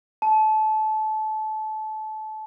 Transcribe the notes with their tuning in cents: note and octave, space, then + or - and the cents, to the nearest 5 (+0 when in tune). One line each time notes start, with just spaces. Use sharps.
A5 -25